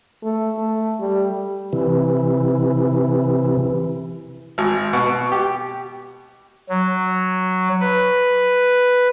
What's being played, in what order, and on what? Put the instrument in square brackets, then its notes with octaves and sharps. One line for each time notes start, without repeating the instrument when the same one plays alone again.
[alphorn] A3
A3
G3
[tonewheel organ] C3 E3
[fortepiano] G#1
B2
G4
[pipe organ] F#3
B4